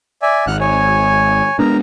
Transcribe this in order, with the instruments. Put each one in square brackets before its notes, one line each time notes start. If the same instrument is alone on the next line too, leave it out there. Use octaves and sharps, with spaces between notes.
[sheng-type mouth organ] D5 E5 G#5
[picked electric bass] G#1 [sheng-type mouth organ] F#5 F6 F#6
[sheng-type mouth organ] C#5 G#5
[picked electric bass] G#3 B3 D4 [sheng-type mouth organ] A#4 A#5